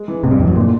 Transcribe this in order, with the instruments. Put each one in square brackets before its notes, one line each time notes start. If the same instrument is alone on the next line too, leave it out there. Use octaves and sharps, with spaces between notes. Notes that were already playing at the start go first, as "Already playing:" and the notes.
Already playing: [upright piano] G#3
E3
[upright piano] A1 [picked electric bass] C3
[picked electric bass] G2
[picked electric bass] F2 [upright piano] E3
[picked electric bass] F#2
[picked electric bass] A#2 [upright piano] D3